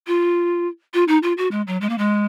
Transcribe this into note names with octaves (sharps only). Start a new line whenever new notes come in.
F4
F4
D#4
F4
F#4
G#3
F#3
G#3
A#3
G#3